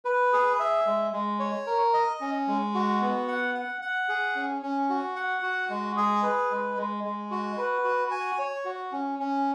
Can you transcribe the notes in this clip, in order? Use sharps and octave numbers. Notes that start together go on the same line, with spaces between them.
B4
G#4
E5
G#3
G#3
C#5
A#4
D#5
C#4
G#3
F#4
B3
F#5
F#5
F#5
G#4
C#4
C#4
F#4
F#5
F#4
G#3
G#4
B4
G#3
G#3
G#3
F#4
B4
F#4
G#5
C#5
F#4
C#4
C#4